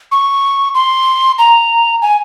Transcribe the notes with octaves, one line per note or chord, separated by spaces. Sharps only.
C#6
C6
A#5
G#5